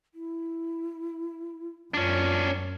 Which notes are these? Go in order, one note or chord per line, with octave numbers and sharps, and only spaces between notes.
E4
F#2 C#4 D4 F4